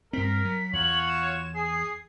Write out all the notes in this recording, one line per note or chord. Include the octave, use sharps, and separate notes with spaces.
G2 C4 A#4 B6
F#3
E2 F4 F#4 C#5 F#7
E7
G#4 C7